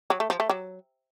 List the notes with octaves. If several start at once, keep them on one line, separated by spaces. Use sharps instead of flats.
F#3
A3
F3
A3
F#3